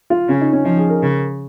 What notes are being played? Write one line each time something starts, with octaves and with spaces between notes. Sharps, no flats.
F4
C#3 C#4
D#4
C#4
F3 D#4
G#4
A#4
C#3